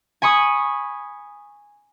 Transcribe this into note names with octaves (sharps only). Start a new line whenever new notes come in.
G#5 B5 C#6 D#6